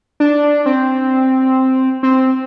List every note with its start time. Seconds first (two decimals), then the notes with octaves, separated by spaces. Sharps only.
0.20 D4
0.66 C4
2.03 C4